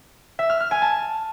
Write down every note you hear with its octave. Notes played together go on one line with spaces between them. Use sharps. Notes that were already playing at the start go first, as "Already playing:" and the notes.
E5
F6
F6
G#5
A5